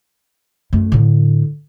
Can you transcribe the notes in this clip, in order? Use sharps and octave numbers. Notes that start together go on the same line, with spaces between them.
F#2 A3
A2 D3